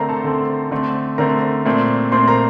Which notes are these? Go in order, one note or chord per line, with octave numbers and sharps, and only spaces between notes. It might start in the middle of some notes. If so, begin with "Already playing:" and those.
Already playing: D3 A3 C4 A#4 C5 A#5 C6
A4 A5
D3 A3 C4
D3 A3 C4
D3 A3 C4 A#4 A#5
A#2 A3 C4
A#2 A3 C4 C5 C6
A#4 A#5